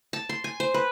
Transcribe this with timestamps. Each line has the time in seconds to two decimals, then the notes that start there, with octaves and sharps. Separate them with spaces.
0.13 A5
0.29 C6
0.44 G#5
0.60 C5
0.74 B4